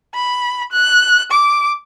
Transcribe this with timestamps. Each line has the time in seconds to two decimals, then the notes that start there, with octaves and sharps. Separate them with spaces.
0.14 B5
0.72 F#6
1.31 D6